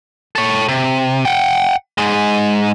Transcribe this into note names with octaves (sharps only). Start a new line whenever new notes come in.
A4 C#5
C3
F#5 G5
G#2 G#3